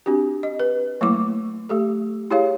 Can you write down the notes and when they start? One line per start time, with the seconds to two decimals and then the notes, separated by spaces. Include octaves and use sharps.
0.06 C4 D4 F#4 G4
0.43 D#5
0.60 B4
1.01 F#3 A3 A#3 E4 D6
1.69 A3 G4 A4
2.30 E4 G4 G#4 C#5 F5